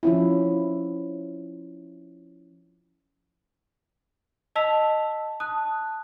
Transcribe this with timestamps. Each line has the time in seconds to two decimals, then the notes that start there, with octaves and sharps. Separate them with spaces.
0.03 F3 C#4 E4
4.56 D#5 A5 E6 B6 F7
5.40 A5 D#6 F#6